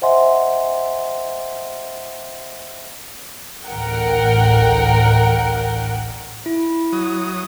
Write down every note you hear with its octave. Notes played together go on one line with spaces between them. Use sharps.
C5 D#5 E5 F#5 G#5 C6
A1 D2 A#4 F#5 G5
E4
F#3 D#6